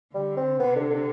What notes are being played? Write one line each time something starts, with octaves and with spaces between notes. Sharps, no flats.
D3 G3
C4
C3 B3
D3
D3